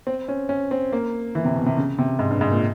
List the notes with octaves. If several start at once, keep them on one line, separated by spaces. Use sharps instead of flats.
C4
C#4
C#4
C4
A#3
E3
C3
B2
C3
C#3
C3
G#2
G2
G#2
A#2